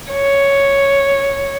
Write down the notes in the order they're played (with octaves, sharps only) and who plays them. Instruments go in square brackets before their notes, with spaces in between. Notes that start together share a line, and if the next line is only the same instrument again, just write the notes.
[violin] C#5